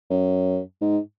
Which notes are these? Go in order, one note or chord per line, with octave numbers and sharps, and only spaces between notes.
F#2
G#2